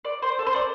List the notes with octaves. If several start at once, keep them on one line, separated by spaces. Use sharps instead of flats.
D5
C5
A4
C5
D5